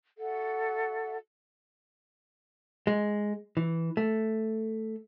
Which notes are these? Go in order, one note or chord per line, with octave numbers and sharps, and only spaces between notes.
F#4 A4 E5 F#5
G#3
E3
A3